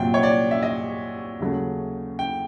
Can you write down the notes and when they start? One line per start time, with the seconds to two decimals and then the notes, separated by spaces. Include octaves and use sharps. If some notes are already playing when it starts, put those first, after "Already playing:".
Already playing: C2 A#2 F#3 G5
0.14 C#5
0.23 D5
0.51 E5
0.63 D#5
1.40 D#2 C#3 F#3 A3
2.19 G5